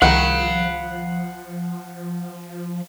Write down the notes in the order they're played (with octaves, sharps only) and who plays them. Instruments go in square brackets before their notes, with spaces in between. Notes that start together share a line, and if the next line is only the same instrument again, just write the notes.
[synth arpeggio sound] C2 D#3 [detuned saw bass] F3 [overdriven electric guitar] F5 B5 [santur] F#5